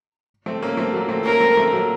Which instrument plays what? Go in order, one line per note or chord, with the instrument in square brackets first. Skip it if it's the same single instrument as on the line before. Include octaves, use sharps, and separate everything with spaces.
[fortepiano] A3 C4
A#3 C#4
A3 C4
F#3 A#3
A3 C4
[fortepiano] A#3 C#4 [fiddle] A#4
[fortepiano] A3 C4
A3 C4
F#3 A#3